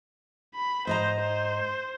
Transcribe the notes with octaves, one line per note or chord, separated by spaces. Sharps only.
B5
G#2 C5 D#5 A#5
C5